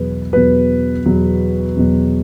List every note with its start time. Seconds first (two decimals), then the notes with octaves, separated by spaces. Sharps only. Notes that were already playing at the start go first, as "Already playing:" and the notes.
Already playing: E2 B2 F#3 B4
0.33 E2 B2 F#3 B4
1.06 E2 B2 F#3
1.76 E2 B2 F#3